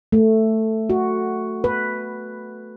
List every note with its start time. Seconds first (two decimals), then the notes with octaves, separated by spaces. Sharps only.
0.12 A3
0.90 F#4
1.64 B4